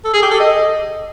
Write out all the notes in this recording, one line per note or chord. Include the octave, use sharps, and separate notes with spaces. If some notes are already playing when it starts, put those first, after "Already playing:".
A4
G#4
G4
A4
D#5